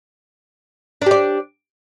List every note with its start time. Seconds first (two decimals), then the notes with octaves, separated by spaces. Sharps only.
1.02 D4
1.06 G4
1.11 D5